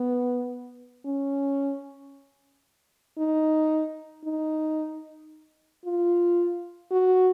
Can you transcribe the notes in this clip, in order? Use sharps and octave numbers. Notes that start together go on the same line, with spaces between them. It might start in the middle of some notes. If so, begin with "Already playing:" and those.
Already playing: B3
C#4
D#4
D#4
F4
F#4